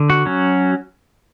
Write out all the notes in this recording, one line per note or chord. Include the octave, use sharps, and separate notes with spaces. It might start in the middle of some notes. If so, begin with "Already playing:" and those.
Already playing: D3
F#4
F#3 C#4